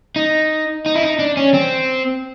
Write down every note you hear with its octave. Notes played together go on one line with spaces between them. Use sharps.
D#4
D#4
E4
D#4
D4
C#4
C4